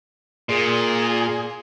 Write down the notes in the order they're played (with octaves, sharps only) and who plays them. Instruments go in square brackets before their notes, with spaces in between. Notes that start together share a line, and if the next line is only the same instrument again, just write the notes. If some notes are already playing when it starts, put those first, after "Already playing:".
[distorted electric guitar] A#2 [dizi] G#4